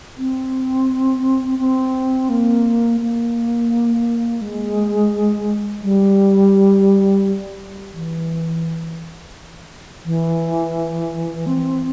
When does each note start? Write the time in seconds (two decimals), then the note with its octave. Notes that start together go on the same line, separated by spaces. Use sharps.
0.18 C4
1.59 C4
2.29 A#3
3.00 A#3
4.41 G#3
5.82 G3
7.94 E3
10.05 E3
11.47 C4